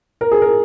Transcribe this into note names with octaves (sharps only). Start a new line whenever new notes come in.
A#4
G#4
A#4